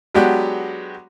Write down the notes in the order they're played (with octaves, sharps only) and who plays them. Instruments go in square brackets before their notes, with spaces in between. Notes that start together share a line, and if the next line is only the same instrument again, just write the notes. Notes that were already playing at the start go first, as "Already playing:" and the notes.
[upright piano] F#3 G#3 B3 D4 F#4 G4